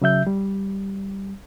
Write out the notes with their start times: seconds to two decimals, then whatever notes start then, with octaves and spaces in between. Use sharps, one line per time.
0.02 C#3 F#3 E5 G6
0.27 G3